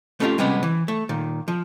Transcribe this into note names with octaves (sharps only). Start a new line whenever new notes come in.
A3 B3 C#4 D#4 F4 G4
C3 G3 G#3 B3 C#4
E3
A3
A#2 D#3
F3